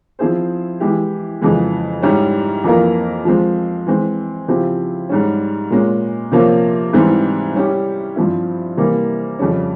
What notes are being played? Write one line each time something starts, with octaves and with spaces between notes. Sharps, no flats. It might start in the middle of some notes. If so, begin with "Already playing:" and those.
F3 C4 E4 G#4 C5
E3 G#3 E4 G4
F2 C#3 E3 G#3
G#2 G3 C#4 E4 G4
F2 E3 A#3 F4 A#4
F3 G#3 C4
E3 G#3 C4
C#3 F3 C4 E4 G4
G#2 G3 C#4
A#2 G#3 C#4
C3 F3 A#3 C#4
G#2 E3 G3 C4 E4
G3 C#4 E4 G4
G2 F3 C4 E4
C3 E3 G3 A#3
F2 C#3 G3 C#4